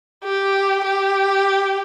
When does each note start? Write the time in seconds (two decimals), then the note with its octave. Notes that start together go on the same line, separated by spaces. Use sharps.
0.24 G4
0.84 G4